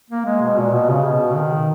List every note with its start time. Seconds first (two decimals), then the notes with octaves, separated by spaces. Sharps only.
0.10 A#3
0.25 G#3
0.42 B2
0.57 A#2
0.72 B2
0.89 C#3
1.04 B2
1.31 C#3
1.35 D#3